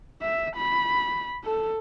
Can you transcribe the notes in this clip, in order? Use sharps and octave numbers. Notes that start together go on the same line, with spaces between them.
E5
B5
A4